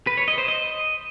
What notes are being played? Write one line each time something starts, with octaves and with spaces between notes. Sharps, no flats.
B4
C#5
D#5
C5
D#5